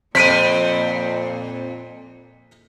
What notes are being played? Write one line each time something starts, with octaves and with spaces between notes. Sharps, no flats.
F2 A#2 C4 B6 D7 D#7